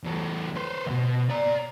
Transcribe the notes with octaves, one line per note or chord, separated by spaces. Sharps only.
E2 A4
B4 C5
D#2 B2
D5 A#5